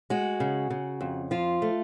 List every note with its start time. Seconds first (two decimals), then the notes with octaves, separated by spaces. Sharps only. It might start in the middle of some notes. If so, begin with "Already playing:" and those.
0.10 G#3 F#4
0.40 C#3
0.70 C#3
1.01 F2
1.31 F3 F4
1.62 A3